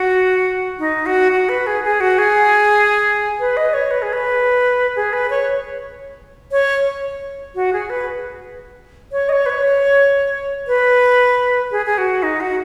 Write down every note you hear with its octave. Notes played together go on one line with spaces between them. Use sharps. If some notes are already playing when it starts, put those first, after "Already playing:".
Already playing: F#4
D#4
F#4
F#4
B4
G#4
G#4
F#4
G#4
B4
D#5
C#5
B4
G#4
B4
G#4
B4
C#5
C#5
F#4
G#4
B4
C#5
D#5
C#5
B4
C#5
B4
G#4
G#4
F#4
D#4
F#4